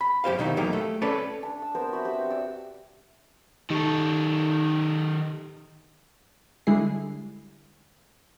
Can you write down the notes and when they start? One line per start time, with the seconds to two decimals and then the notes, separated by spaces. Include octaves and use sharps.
0.01 B5
0.24 F#2 G4 C5 F5
0.39 B2 D#3 D#4 E4
0.57 E2 F#3 A#3 D#4 G4
0.73 A3
1.02 C#4 A4 B4 C#5 D5
1.43 D4 A5
1.62 E6
1.75 B3 C4 A#4 C5
1.93 F#4 E5 G5 B5
2.04 C4 G4 F#5
2.30 F#4 D5 E6
3.71 D#3 D#4 G4 A4 C#6
6.67 D3 G3 G#3 E4 G#4 C7